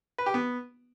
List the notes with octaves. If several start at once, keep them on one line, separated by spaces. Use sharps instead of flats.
B4
G4
B3